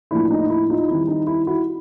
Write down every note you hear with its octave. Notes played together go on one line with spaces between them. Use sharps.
A2 F3 A#3 D4 E4
D#4
E4
D#4 F4
D#3 G3 C4 E4
D#4
E4
E4 F#4